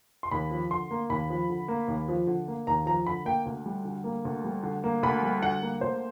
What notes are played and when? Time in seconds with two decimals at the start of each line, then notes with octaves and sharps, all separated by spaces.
0.23 C6
0.31 D#2 B5
0.51 F3
0.70 D3 C6
0.91 A#3
1.10 D#2 B5
1.30 F3
1.50 D3
1.68 A#3
1.88 D#2
2.08 F3
2.27 D3
2.48 A#3
2.67 D#2 A#5
2.86 F3 A#5
3.07 D3 B5
3.25 A#3 G5
3.46 D2
3.66 G3
3.85 D3
4.04 A#3
4.25 D2
4.44 G3
4.63 D3
4.84 A#3
5.03 D2 B5
5.23 G3
5.43 D3 F#5
5.62 A#3
5.81 D2 C5